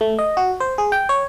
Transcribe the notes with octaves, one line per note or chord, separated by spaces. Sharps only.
A3
D#5
F#4
C5
G#4
G5
C#5